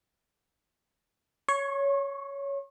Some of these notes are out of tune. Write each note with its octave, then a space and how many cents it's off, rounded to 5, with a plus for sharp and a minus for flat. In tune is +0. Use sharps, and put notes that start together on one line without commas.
C#5 +10 C#6 -35